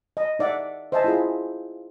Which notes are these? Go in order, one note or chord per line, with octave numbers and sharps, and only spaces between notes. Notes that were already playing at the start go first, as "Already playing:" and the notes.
D#5
D#4 D5 E5 F#5
C5 D#5 E5 G#5 A5
E4 F4 G#4